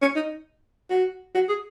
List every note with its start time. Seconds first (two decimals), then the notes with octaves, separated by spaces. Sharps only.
0.01 C#4
0.15 D#4
0.90 F#4
1.34 F#4
1.49 G#4